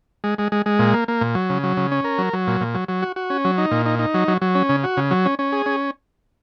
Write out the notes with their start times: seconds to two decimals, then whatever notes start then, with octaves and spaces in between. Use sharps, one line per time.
0.24 G#3
0.38 G#3
0.52 G#3
0.66 G#3
0.79 A#2
0.94 A#3
1.08 A#3
1.21 A#2
1.35 F#3
1.50 C#3
1.63 F#3
1.77 C#3
1.92 C#4
2.04 A#4
2.18 F#3
2.33 F#3
2.47 A#2
2.61 A#2
2.75 F#3
2.88 F#3
3.02 F#4
3.16 F#4
3.30 C#4
3.45 F#3
3.58 D#4
3.71 A#2
3.86 D#4
3.99 D#4
4.14 F#3
4.28 F#3
4.41 F#3
4.55 C#4
4.69 C#3
4.84 F#4
4.97 C#3
5.11 F#3
5.26 C#4
5.39 C#4
5.52 G#4
5.66 C#4